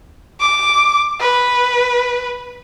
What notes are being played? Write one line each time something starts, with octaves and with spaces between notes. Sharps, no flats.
D6
B4